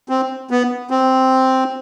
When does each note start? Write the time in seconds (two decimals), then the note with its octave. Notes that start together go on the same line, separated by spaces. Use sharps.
0.09 C4
0.50 B3
0.90 C4